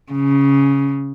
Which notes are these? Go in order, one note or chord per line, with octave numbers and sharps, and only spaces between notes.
C#3